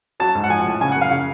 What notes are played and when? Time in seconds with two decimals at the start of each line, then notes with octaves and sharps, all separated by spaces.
0.20 F#3 A5
0.35 G#2
0.44 F#5
0.50 F3 G#5
0.66 A2
0.81 C#3 G#5
0.92 F#5
0.96 F#2
1.01 F5
1.11 C#3